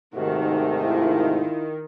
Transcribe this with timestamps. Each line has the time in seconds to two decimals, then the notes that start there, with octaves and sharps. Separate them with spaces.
0.15 G#2 C3 D#3 A3 F#4
0.83 E4 F4